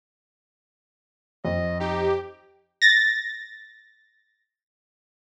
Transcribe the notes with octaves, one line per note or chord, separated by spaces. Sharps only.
F2 D#5
D#4 G4
A6 A#6